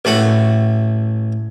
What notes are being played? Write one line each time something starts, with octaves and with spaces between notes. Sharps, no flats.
A1 A3 F#4 F#5